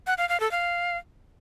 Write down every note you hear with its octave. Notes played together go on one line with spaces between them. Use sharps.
F#5
F5
F5
A4
F5